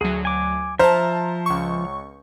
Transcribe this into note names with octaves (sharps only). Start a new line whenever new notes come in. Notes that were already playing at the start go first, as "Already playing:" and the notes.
D2 F#3 G#4
G#5 D6
F3 C5 E5 A5 A#5 F6
C#2 C#6